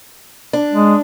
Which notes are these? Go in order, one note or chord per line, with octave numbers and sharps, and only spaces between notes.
D4
G#3